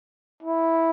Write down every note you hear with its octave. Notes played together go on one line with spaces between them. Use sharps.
E4